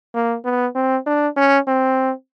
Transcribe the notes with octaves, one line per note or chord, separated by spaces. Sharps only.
A#3
B3
C4
D4
C#4
C4